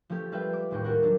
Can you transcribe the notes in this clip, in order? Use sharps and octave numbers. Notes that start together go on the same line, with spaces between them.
F3 A3 C#4 G4 A4 G6
G3 G#3 F4 B4 E5 G5
D6
A1 D#2 A2 G#3 G5 C#6
F4 F#4 A4 A#4 F#5
F#3 C4 D4